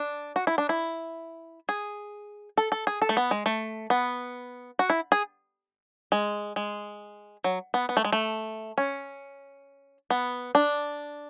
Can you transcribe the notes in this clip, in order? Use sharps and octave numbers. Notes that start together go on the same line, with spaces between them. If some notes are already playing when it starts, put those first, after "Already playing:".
Already playing: D4
F#4
E4
D4
E4
G#4
A4
A4
G#4
A4
A3
B3
G#3
A3
B3
F#4
E4
G#4
G#3
G#3
F#3
B3
B3
A3
G#3
A3
C#4
B3
D4